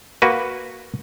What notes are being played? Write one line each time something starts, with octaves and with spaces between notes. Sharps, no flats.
A#3 F#4 B4